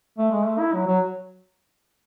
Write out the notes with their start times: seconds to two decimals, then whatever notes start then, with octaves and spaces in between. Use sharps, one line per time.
0.18 A3
0.32 G#3
0.46 A3
0.59 E4
0.73 F#3
0.87 F#3